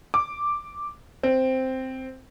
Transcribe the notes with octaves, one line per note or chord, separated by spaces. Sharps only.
D6
C4